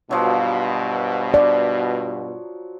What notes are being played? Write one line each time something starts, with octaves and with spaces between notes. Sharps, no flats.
G2 B2 F3 F#3
D5